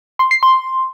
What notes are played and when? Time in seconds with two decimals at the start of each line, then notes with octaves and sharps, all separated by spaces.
0.19 C6
0.31 C7
0.43 C6